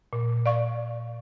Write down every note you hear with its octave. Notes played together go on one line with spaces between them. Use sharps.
A#2
D5 F5 C#6